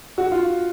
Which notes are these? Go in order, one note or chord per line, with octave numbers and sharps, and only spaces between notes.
F#4
F4